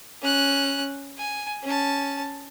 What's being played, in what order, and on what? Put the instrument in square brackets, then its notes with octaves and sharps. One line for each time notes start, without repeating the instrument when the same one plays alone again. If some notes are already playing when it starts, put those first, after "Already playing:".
[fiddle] C#4 F#6
G#5
C#4 A5